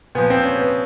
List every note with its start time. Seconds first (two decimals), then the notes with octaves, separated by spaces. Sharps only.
0.15 A#2 F3 B3
0.30 C4
0.43 C#4
0.58 B3